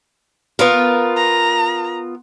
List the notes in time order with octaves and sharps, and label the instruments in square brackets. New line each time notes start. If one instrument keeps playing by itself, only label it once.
[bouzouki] B3 F4 A#4
[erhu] A#5